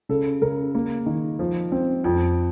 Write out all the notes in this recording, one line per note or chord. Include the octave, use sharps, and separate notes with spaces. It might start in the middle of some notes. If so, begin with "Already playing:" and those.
C#3 A4
C#3 A#4
A#3
D#3
F3
C4
F2